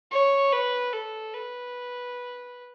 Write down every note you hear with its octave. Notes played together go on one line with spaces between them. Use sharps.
C#5
B4
A4
B4